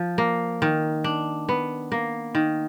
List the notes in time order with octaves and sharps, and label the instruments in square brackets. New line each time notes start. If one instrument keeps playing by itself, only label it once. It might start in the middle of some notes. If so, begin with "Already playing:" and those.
Already playing: [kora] F3
A#3
D#3
D4
B3
A#3
D#3